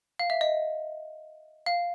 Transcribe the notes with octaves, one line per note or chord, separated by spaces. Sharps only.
F5
E5
D#5
F5